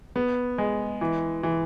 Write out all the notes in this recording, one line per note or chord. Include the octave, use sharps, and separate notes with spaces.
B3
G#3
E3
E3